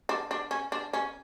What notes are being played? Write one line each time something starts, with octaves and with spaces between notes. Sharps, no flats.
D4
D4
C#4
D4
C#4